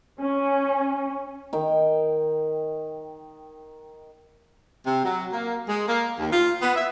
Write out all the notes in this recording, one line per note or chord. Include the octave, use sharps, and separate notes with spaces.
C#4
D#3 G5
C3
F#3
A#3
G#3
A#3
D#2
F4
B3
E5